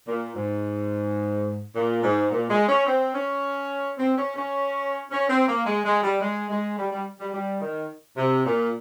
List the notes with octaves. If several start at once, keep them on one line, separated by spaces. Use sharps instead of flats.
A#2
G#2
A#2
G#2
A#2
G#3
C#4
C4
C#4
C4
C#4
C#4
C#4
C4
A#3
G#3
G#3
G3
G#3
G#3
G3
G3
G3
G3
D#3
C3
A#2